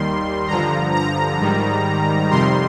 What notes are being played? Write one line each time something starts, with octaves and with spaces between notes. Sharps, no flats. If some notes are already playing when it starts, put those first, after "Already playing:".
Already playing: D#2 D#3 G3 C6
G2 D3 F3 A#5
A#5
G#2 D#3 G3
F2 C3 D#3 G3 C6